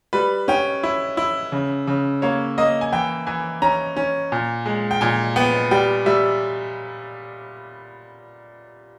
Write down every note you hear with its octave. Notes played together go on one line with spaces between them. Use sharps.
G3 B4
C#4 G5
E4
E4
C#3
C#3
A#3 C#5
A#3 D#5
G#5
E3 G5
E3 G#5
C#4 A#5
C#4
A#2
G#3
G5
A#2 G#5
B3 G5
G3 G5
G3 E5